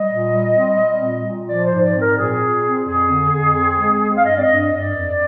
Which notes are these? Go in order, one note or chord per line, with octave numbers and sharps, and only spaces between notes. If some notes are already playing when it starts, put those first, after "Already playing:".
Already playing: G3 D#5
A#2
G3
C4
G3
A#2
A#2
F3 D5
C5
G#2
D5
C4
A#4
A#2 G#4
A#2
C4
F2 G#4
D3
F2
C4
G#3
C4
F5
G2 D#5
D5
D#5
G2
D#5
G2
D5
F2